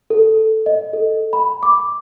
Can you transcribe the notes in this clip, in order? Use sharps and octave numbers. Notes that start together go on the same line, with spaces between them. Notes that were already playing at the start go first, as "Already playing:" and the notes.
A4
D#5
A4
B5
D6